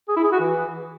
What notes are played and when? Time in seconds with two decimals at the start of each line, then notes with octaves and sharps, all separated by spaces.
0.08 G#4
0.16 E4
0.24 G#4
0.32 F#4
0.40 E3